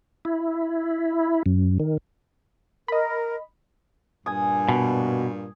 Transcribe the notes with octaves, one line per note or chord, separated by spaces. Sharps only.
E4
F#2
D#3
A#4 D#5 B5
G2 A#2 G#5 D#6
B2